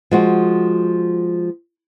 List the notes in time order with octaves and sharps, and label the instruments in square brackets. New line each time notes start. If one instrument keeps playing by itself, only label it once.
[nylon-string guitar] F3 G#3 F#4